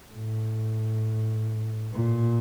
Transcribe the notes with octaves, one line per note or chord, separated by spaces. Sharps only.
A2
A#2